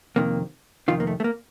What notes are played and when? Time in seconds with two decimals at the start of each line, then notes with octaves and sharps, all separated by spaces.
0.16 F2 C3 D#3 A#3
0.88 F2 C3 D#3 F4
1.00 A#3
1.07 A3
1.20 A3
1.24 A#3